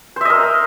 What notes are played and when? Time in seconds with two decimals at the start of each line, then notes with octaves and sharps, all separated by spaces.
0.16 C5
0.21 E5
0.25 D#5
0.30 A#4